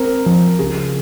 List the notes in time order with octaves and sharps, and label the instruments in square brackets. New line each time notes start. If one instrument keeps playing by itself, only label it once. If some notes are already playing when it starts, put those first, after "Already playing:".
Already playing: [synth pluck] C4 [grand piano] A#4
[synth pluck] F3
[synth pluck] C#3 [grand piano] G#4